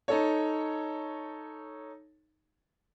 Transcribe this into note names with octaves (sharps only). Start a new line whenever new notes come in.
D#4 A4 C#5